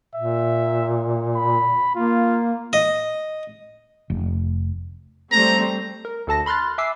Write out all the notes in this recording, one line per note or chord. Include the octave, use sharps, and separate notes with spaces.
A#2 E5
B5
A#3 F4
D#5
F1
G3 A3 C4 A#5
A#4
D2 A4 A5 A#6
B5 C6 F6 F#6 A6
E5 G#5 D6 E6 C7